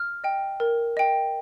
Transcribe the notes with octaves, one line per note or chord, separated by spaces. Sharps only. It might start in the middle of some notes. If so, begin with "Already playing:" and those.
Already playing: F6
D#5 G5
A#4
D#5 G5